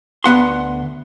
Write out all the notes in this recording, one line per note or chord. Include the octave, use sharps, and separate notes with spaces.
D2 B3 F#5 C6